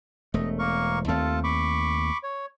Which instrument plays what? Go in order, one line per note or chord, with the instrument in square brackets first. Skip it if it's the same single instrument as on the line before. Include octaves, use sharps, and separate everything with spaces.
[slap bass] E1 A3 [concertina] D#5
[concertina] A#3 A#4 C#6
[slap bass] D#2 A3 C4 [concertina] F4 A4 A5
[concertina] B5 C#6 D6
C#5